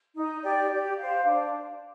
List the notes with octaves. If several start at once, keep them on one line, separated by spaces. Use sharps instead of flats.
D#4
G4 D5
G4
C5 F5
D4